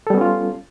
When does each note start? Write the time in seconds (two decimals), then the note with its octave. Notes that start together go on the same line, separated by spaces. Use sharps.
0.07 A4
0.10 G3
0.14 B3
0.18 C#4
0.21 F4